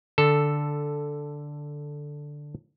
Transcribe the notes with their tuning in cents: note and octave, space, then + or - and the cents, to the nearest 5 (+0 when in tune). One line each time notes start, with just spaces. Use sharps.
D3 +0 A4 +0